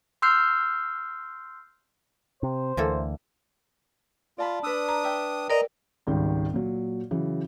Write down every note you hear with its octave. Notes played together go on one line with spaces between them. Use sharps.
C6 E6 F6 G6 C7
C3 C5
D2 E3 A#3 A4
F4 D5 A5 B5
D4 B4 D#6 E6
A#5
E5 G5
A#4 D5 D#5 A#5
G#1 C#2 D#3 G3
A#2 F#3
C#3 E3 F#3